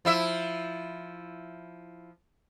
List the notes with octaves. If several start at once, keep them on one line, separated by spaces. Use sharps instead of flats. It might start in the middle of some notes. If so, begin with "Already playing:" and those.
F3 E4 E5